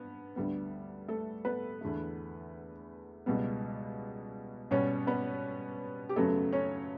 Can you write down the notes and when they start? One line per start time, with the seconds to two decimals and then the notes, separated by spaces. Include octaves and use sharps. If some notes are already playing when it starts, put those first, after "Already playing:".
Already playing: G2 B3
0.36 D2 D3 G3 B3
1.08 A3 A4
1.45 B3 B4
1.81 E2 D3 A3
3.26 C#2 B2 G3 B3
4.71 B2 G3 B3 C#4 C#5
5.07 B3 B4
6.09 G4
6.16 F#2 C#3 F#3 A3 B3 A4
6.53 C#4 C#5